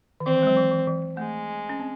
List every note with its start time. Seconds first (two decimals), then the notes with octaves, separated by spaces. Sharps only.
0.20 D#3
0.26 E3 C4
0.36 E3
0.43 G#3
0.47 F#3
0.57 E3
0.72 E3
0.87 E3
1.17 G#3 A3
1.69 C#4
1.79 C4